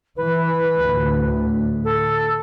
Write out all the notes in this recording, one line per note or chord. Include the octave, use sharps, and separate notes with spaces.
E3 B4
D2 A2
A4